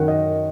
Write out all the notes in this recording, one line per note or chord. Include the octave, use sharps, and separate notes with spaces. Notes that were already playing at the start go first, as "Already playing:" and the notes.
Already playing: F#2 D#3 F#5
D#5